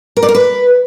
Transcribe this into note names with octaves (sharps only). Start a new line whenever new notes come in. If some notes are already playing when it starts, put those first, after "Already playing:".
A#4
D5
A#4
B4